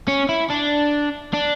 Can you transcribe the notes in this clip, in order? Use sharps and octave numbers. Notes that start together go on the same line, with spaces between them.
C#4
E4
D4
D4